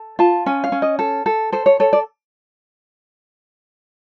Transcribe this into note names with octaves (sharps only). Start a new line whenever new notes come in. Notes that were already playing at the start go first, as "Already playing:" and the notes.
Already playing: A4
F4 A5
C#4 G#5
F5
C#4
D#5
A4
A4
A4 C5
C#5
A4 C#5
D5